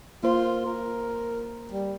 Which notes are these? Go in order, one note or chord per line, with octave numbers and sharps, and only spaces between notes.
A#3 F4 C5
A#4
G3